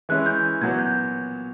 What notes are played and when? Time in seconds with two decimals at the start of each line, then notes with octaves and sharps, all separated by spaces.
0.09 E3 G#3 C#4 E4 F#6
0.26 G6
0.61 A#2 F#3 B3 G#6
0.79 G6